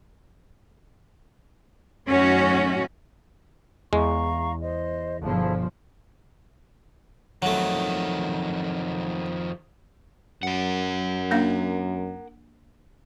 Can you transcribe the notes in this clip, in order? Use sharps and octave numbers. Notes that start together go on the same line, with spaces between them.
F#2 A2 D#3 C#4 F#4
E2 G#3 F5 A#5 C#6
C5 D#5
G1 B2 F3 E4 G#4 A5
F2 D#3 F#3 A3
F#2 A#4 F#5
A#3 D4 F5